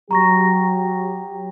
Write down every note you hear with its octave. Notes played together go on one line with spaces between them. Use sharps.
F#3 G4 A#5 C#6 A#6